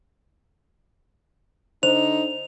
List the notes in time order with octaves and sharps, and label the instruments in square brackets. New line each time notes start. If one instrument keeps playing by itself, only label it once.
[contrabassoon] D3 [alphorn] D#4 [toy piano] C5 [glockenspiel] F7